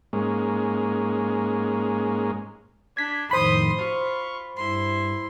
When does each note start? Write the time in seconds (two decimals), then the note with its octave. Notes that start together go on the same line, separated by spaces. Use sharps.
0.13 G#2 G#3 A#3 C#4
2.97 D4 G#6 B6
3.31 F2 A2 D#3 C5 B5 C6 D#6
3.79 F4 C#6
4.57 G2 E4 C6